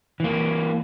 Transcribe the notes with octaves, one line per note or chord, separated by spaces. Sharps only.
E3 A#3